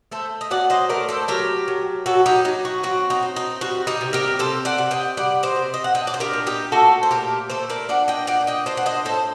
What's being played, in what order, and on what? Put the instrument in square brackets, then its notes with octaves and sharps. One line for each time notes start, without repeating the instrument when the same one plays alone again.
[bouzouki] A3 A4 C5
D#5
F#3 D5 F#5
C5 D#5
A3 A#4 D5
A4 C5
F#3 G4 A#4
F#3
F#3 F#4 A4
D#4 G4
F#3 D#4
F#4
C4 F#4
D#4
C4
D#4
G3 F#4
D#4 G4
C3
G4 A#4
C3 A4 C5
D5 F#5
C3
D#5 G5
G3 D5 F#5
C5 D#5
C3
D#5
F#5
D4 D#5 G5
D5
C5
G4 A#4
A#2
D#4 G4
A3 F#4 A4
C5
A#2 G4 A#4
A3 A4 C5
A#4 D5
D4 D5 F#5
D#5 G5
A#2 D5 F#5
D#5 G5
D4 C5 D#5
F#5
C5 D#5
A2 A4 C5